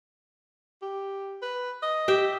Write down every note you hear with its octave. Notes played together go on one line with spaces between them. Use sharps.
G4
B4
D#5
G4 E5 G5